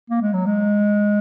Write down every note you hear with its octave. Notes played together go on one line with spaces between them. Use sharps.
A#3
G#3
F#3
G#3